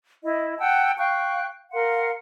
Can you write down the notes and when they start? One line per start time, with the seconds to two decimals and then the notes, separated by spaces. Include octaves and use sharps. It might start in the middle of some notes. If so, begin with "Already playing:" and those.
0.23 E4 D#5
0.59 F#5 G5 A5 E6
0.98 F5 G5 C#6 F#6
1.72 A#4 F5 F#5 C6